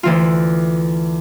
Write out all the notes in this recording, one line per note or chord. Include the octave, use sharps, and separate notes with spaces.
D2 E3 F4